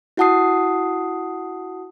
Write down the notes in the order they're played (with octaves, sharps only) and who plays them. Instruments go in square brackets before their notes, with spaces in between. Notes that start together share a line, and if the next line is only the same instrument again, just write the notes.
[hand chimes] E4 F#4 F#5 A5 D#6 C7